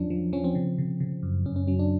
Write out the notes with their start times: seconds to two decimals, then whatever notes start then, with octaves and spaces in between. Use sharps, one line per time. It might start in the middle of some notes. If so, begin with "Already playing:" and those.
Already playing: E2 F3 F#3 C#4 D4
0.10 F3
0.33 F3 C#4
0.44 C4
0.55 C#3
0.78 C#3
1.00 C#3
1.23 F#2
1.46 F#2 C#4
1.56 C#4
1.67 F#3 C#4
1.79 D4